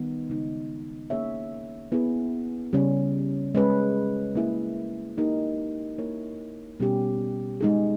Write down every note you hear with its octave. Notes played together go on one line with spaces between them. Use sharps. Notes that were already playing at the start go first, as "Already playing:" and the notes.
Already playing: D#3 G3 B3 D#4
C#3 G#3 D#4
A#3 C#4 G#4 C#5 E5
B3 E4 G#4
C#3 G3 C#4
G#3 C#4 G#4 B4
A#3 C#4 E4 G#4
A#3 D#4 G4 A#4
A#3 E4 A#4 C#5
B2 G3 C#4 G4
G#3 D#4 G#4